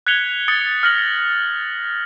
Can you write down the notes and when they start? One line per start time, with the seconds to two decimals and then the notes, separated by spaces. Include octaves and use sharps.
0.07 F#6 G#6 B6 C#7 F7 G7
0.48 D#6 A6 C#7
0.83 F6 F#6 A#6 C#7 F#7